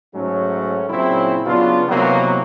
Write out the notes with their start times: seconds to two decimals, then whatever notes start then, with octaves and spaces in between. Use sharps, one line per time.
0.15 G#2 F#3 A3 C#4
0.89 A#2 C#3 F#3 C4 E4
1.45 C#3 F#3 B3 D4 F4
1.88 C3 E3 F#3 A#3 B3 D#4